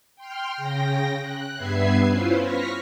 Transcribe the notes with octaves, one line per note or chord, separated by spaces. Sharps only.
G5 C6 F6
C#3 G5 A#6
F#6
G2 B3 B4 E5 G#6 C7
C#4 E4 F4 B4 C5
C#6 F6 A#6 B6